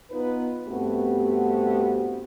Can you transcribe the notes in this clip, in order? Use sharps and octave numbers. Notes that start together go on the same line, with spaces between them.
B3 D#4 F4 B4
G2 A3 B3 C4 F#4 G4